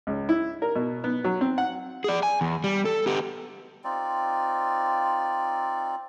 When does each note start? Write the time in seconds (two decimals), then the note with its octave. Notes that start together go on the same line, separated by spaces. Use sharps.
0.07 C#2
0.29 E4
0.62 A#4
0.75 B2
1.04 B3
1.24 F#3
1.41 C4
1.58 F#5
2.04 G#4 D5
2.23 G#5
2.41 E2
2.64 G3
2.85 A4
3.07 B3 G4
3.84 C4 D#4 F4 D5